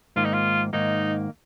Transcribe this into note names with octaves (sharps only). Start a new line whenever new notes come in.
G#2 D#3 A#3 F4
D#4
F4
G#2 D#3 A#3 D#4